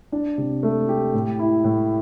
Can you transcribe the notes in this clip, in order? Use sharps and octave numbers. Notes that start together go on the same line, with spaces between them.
D4
C3
A3
G4
A2
E4
A2